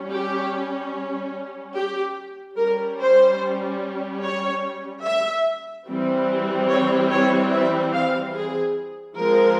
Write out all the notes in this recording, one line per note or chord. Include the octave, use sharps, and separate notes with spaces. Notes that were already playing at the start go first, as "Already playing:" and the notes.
Already playing: G3 C#4
G4
G4
G3 C#4 A#4
C5
C#5
E5
E3 G3 C4
C#5
C#5
E5
F5
G#4
F3 G#3 C4 A#4